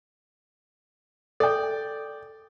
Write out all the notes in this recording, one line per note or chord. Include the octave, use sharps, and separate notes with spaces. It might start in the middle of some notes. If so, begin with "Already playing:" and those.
A4 D5 G5